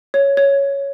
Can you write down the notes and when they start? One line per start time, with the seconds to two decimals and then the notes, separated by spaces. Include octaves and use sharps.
0.14 C#5
0.37 C#5